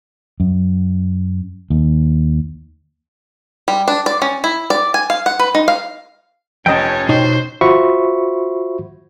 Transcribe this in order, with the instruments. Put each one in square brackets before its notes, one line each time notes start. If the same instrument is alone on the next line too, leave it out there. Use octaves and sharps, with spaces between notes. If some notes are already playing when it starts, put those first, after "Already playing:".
[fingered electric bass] F#2
D#2
[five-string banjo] G3
D4
D5
C#4
E4
D5
G#5
F5
F#5
B4
D#4
F5
[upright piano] F1 D#5 [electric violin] C#4 C#5 [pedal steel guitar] G5 A5
[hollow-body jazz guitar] B2 D#4 C#5 [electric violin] C5
[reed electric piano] F4 F#4 C5 E5 B5 C#6